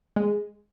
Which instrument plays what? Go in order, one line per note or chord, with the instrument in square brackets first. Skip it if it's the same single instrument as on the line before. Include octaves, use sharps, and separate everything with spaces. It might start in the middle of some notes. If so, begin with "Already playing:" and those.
[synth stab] G#3